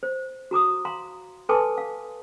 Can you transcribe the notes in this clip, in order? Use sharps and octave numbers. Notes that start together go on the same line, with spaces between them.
C5
F#4 A#5 D6 D#6
F5 A#5 C6
A4 B4 G#5 A5 C6 D6
F5